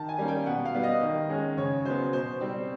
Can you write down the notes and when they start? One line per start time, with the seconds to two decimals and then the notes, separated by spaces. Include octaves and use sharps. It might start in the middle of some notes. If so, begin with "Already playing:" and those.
Already playing: D#3 A5
0.09 G#5
0.18 G3 A#3 C#4
0.28 G5
0.46 B2 F#5
0.65 F5
0.74 G3 B3
0.83 D#5
1.01 D#3
1.30 G#3 C#4
1.57 C#3 C#5
1.85 F#3 B3 C5
2.13 B2 C5
2.41 G3 C4